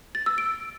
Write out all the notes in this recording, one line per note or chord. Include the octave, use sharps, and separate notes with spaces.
A6
E6
D7